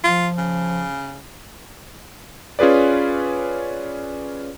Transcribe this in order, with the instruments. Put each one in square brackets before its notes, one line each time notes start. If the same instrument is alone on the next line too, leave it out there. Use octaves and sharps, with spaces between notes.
[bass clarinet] F3 [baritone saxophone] F4
[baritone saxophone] C#3
[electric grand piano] C#4 F4 G#4 B4 D5